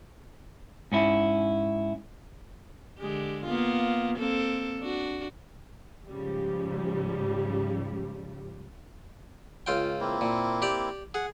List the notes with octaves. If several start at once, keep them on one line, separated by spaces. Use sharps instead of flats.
G#2 C#4 E4
D3 G#3 G4
A#3 B3 F4
A#3 C4 A4
D4 F#4
G#2 C#3 F3 G3
C#2 F4 G5
A#3 C4 E4
A#2
G4 D5
G#4 F#5